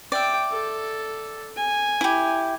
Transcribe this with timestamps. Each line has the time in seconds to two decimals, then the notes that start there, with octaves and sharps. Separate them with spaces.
0.12 D5 E5 G5
0.51 A4
1.56 G#5
2.01 E4 G4